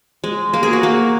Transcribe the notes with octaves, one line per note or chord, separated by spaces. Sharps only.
G#3
A#3
G#4
F#4
A#3